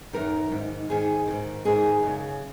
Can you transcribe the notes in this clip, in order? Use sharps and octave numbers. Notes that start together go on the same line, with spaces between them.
F#2 D#3 A#4
G#2 D#3
G#2 D#3 G#4
G#2 D#3
G#2 D#3 G#4
F#2 C#3